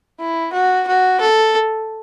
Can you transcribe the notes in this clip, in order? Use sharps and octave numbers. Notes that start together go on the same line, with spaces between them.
E4
F#4
F#4
A4